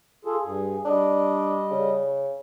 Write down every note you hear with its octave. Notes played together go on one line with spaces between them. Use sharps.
F4 G#4 A4
G2 G#4
G3 D4 D#5
C#3